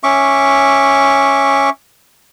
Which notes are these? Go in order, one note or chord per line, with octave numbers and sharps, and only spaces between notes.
C#4 E5 C#6 D6